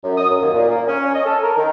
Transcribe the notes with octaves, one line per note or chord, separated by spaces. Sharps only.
F#2
D#6
F#2
D#2
A#2
A#3
C#4
D#5
A4
A#4
D#3